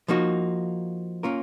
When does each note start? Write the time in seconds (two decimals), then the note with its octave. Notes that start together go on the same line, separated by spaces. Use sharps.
0.08 F3 A#3 D#4 F#4
1.23 A#3 C#4 F4 A#4